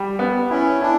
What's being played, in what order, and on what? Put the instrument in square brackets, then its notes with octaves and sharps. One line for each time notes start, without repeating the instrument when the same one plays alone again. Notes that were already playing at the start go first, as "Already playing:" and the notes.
Already playing: [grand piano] G3
B3
[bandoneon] C#4 [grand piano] E4
[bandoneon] D4 [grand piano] E4